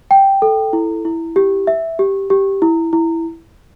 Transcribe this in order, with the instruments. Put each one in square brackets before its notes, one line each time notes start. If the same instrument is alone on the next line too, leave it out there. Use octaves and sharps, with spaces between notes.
[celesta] G5
A4
E4
E4
G4
E5
G4
G4
E4
E4